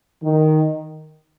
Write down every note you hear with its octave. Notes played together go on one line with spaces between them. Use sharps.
D#3